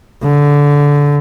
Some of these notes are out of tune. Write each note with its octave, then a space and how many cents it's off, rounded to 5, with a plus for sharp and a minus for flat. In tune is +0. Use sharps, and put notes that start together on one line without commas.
D3 -20